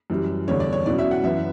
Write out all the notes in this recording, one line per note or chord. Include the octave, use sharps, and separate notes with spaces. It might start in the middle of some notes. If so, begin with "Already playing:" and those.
F#2 E3 G3
E2 D3 G3 D4 C#5
D5
C#5
B2 F#3 C#4 E4 D5
E5
F#5
F#2 E3 B3 E5